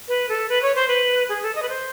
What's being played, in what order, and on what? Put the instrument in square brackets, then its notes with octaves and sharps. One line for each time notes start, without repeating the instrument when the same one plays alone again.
[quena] B4
A4
B4
C#5
C5
B4
G#4
A4
D#5
B4
C5